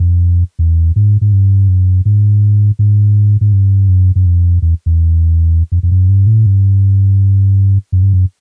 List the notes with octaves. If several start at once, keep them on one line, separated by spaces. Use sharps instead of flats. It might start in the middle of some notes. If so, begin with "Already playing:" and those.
Already playing: F2
E2
G#2
G#2
G2
F#2
G#2
G#2
G#2
G2
F#2
F#2
F2
E2
E2
F2
F2
F#2
G2
A2
G2
F#2
G2
F#2